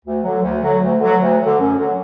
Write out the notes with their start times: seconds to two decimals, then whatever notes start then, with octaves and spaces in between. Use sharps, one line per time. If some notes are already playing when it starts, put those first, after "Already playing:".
0.05 D2
0.23 D3 F#3
0.43 D2
0.61 D3 F#3
0.81 D2
1.00 D3 F#3
1.20 D2
1.39 D3 F#3
1.58 F#2
1.77 D3 F#3